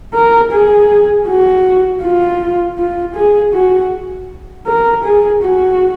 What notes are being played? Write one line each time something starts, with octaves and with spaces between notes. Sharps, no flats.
A#4
G#4
F#4
F4
F4
G#4
F#4
A#4
G#4
F#4